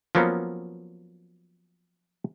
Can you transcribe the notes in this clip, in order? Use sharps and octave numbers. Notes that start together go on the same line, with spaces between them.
F3 F#3 A#3 B3 C#4